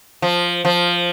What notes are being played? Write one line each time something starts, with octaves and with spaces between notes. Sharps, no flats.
F3
F3